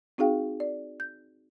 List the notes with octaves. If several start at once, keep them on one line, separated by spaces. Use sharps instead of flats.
C4 D#4 F#4 G#4 F5 G5
D5
G6